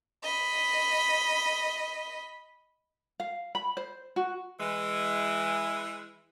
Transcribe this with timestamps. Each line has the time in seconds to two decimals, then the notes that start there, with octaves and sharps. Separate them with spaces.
0.25 D#5 B5
3.20 F5
3.55 B5
3.77 C5
4.16 F#4
4.60 E3 G#3